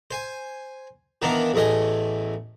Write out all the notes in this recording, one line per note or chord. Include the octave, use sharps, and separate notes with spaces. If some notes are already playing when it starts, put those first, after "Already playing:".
C5 G#5
D#3 E3 A#3 B3 D4
A1 E2 A3 D#5 G#5